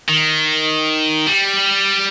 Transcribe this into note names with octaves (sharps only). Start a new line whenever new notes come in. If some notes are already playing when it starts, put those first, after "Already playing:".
D#3
G3